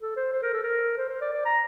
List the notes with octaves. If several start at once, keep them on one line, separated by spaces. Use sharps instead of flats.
A4
C5
C5
A#4
A4
A#4
C5
C5
D5
D5
A#5